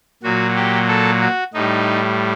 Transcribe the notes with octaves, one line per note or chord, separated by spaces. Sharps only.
A#2 F#3 F#4
G4
A4
F#4
A2 G3 D#4